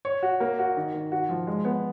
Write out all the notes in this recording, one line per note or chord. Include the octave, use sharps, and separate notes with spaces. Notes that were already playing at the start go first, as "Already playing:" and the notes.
C#5
F#4
A#3
F#4
D#3
D#3
F#4
F3
G#3
B3